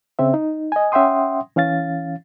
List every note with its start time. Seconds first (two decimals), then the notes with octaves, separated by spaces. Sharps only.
0.19 C#3 C4 E5
0.34 D#4
0.72 D#5 G#5
0.92 C#4 E5 F#5 G5 C6 D#6
1.56 E3 C#4 F5 A6